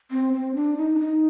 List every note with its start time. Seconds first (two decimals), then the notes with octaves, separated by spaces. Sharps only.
0.11 C4
0.33 C4
0.55 D4
0.77 D#4
0.95 D4
0.99 D#4